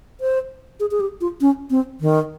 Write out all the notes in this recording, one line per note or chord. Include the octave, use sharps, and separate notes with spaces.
C5
G#4
G#4
G4
F4
C#4
C4
D#3